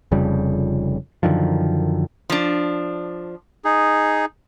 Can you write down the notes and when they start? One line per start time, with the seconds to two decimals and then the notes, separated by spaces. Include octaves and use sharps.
0.12 F1 F2 C#3 G3
1.23 F#2 D3 D#3 F3
2.30 F3 D4
3.65 D#4 G#4